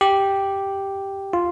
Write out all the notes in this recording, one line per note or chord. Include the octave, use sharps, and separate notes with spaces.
G4
F4